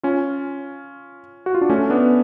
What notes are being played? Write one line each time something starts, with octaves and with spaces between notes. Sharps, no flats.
C#4 F4
F#4
F4
D4
A3 C#4
B3 D4